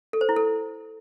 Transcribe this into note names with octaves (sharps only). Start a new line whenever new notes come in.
A4
C5
E4
A4